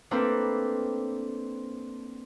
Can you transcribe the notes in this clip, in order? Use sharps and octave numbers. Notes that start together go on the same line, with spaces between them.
A3 A#3 C4 D4 A4 B4